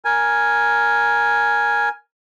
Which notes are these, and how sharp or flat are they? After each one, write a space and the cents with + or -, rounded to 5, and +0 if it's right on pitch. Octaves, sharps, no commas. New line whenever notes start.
A#4 +5 G#5 +0